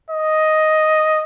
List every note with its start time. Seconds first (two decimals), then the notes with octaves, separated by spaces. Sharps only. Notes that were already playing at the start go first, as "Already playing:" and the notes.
0.10 D#5